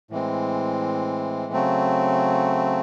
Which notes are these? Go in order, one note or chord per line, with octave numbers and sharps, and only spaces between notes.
A2 E3 G#3 C4
C#3 F#3 A3 C4